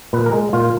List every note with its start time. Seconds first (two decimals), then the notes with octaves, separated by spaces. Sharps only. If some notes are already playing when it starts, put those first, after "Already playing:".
0.13 A#2 B4
0.26 A#4
0.33 G#3
0.53 A#2 F4